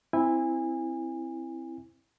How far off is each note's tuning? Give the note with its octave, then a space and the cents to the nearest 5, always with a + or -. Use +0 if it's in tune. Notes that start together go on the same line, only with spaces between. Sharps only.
C4 +0 E4 +0 G#5 -30